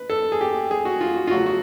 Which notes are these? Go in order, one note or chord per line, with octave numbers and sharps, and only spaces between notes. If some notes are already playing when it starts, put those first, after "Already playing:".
Already playing: B4
A4
G#4
G4
G#4
F#4
F4
F#4
F4
C#3 F#3 A3 F#4
F#4